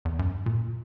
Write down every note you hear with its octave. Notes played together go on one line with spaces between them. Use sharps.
E2
F#2
G2
A#2